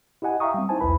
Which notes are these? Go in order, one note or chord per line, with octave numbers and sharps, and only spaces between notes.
E4 G4 D#5 F#5 G#5
E5 F5 G5 A#5 C#6 D#6
G3 C4
D#4 E4 C5 G#5 A5
B1 E2 E4 B4 B5